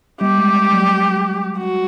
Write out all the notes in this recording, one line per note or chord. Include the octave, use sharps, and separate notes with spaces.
G3 G4
G#3
F#3
F#4